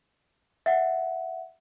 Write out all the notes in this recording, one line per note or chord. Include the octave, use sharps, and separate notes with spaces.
E5 F#5